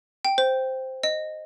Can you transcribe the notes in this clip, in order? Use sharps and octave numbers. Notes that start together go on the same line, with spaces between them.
G5
C5
D#5